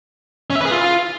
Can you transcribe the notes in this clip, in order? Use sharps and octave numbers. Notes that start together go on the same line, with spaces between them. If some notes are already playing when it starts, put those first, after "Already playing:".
C#4
E5
B4
G#4
F4